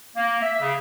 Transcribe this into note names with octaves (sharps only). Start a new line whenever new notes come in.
A#3
E5
C#3